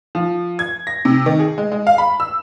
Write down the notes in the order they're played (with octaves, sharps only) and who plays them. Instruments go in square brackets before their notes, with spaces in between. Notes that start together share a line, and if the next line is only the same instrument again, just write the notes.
[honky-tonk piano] F3
G#6
A#6
C3
D#3
G#4
G#3
G#3
F5
B5
E6